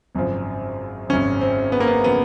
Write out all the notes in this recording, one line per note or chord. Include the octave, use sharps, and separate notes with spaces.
G#1 F#2 C#3 F3
G#1 F#2 C#3 F3 C#4
C4
B3
A#3
B3
C#3 F3 B3